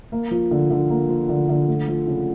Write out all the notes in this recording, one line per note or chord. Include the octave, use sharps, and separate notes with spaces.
A#3
F3
D3
D3
A#3
F3
D3
D3
A3
F3
C#3